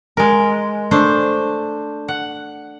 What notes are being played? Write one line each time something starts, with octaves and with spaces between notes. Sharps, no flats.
G#3 A#4
A3 D4 C5
F#5